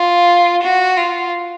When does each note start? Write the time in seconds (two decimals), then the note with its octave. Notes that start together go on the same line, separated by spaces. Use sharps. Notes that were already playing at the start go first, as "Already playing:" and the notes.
Already playing: F4
0.62 F#4
0.97 F4